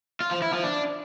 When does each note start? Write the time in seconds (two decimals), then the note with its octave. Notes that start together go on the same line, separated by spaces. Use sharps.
0.20 F4
0.31 F3
0.42 E4
0.53 F3
0.63 D4